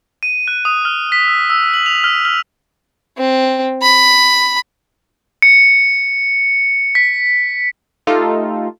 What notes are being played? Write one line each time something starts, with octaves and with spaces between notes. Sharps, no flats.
D#7
F#6
D#6
F6
B6
E6
E6
F#7
F7
F6
F6
C4
B5
C#7
B6
A3 D#4 F4 G4 A4